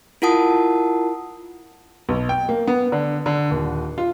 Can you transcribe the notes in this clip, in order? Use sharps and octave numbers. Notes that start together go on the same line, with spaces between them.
E4 F4 A#4 F#5 A5 D#6
B1
G5
A#3
B3
D3
D3
D#1
F4